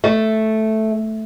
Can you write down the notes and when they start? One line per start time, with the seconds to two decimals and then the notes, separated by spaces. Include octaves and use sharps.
0.04 A3